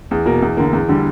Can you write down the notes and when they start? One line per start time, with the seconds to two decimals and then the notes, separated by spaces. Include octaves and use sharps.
0.11 E2
0.26 B2 A#3
0.42 E2
0.57 D3 A#3
0.73 E2
0.89 D3 G3